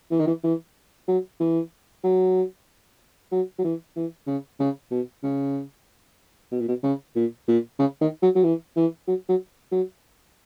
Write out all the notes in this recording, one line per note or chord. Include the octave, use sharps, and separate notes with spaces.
E3
D#3
E3
E3
F#3
E3
F#3
F#3
F#3
E3
E3
C#3
C#3
B2
C#3
B2
A#2
B2
C#3
A#2
A#2
C#3
D#3
F#3
F#3
E3
E3
F#3
F#3
F#3